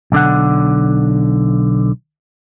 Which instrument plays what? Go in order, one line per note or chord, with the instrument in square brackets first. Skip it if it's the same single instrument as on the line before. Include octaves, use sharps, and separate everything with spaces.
[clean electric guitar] B1 D3 F#5